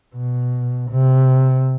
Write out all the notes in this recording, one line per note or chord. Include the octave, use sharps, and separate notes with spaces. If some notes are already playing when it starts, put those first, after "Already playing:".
B2
C3